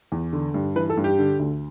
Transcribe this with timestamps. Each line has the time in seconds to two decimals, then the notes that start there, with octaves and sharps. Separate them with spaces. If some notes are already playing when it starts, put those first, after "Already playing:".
0.12 E2
0.33 D3
0.54 G2
0.76 E3 B4
0.90 A4
0.97 G2
1.04 G4
1.18 D3
1.39 D2